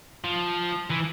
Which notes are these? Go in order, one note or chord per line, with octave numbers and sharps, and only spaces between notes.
F3
E3